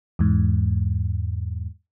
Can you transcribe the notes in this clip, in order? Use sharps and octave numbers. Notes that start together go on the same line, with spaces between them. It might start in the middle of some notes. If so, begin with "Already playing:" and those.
E2 G#2